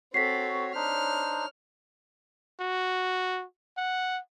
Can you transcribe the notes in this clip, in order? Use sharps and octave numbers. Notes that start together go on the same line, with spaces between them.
C4 F#4 A4 C#5 B6 C7
D4 D#4 C5 C#5 F6
F#4
F#5